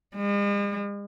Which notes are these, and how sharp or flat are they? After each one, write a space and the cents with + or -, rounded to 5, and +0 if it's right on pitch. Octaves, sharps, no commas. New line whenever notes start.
G#3 -45